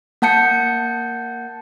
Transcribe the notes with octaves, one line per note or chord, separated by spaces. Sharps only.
A#3 F#5 A5 G6 C#7